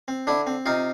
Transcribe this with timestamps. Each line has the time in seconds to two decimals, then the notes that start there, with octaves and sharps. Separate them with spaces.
0.08 C4
0.27 D3 D4 E4
0.47 C4
0.66 C3 D#4 F4